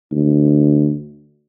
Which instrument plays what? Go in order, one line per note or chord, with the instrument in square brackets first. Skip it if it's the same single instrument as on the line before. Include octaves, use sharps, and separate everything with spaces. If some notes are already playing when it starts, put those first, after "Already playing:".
[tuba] D2